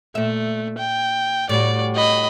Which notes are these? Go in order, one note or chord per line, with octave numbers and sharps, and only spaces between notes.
A#2 A3 E5
G5
A2 G3 F#4 D5
D#5 B5